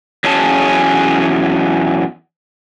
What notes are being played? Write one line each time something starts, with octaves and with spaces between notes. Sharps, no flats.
E2 F#3 C#4 G#4 A5